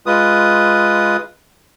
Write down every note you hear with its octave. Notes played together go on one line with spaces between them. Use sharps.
G#3 F4 B4 D#6